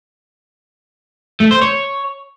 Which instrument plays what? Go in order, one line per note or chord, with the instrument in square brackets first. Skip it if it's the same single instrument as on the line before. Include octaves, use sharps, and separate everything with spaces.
[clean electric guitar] A3
C5
C#5